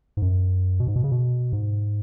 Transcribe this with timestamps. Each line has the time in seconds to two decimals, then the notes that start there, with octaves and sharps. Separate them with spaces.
0.17 G#2
0.22 F#2
0.80 B2
0.87 G#2
0.96 B2
1.04 C#3
1.12 B2
1.53 G#2